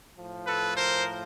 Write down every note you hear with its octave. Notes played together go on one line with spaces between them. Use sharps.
A2 F3
A4 B4
A#4 C5